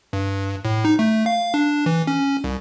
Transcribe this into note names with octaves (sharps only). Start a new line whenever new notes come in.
G2
A2
D#4
A3
F5
D4
E3
C#4
C2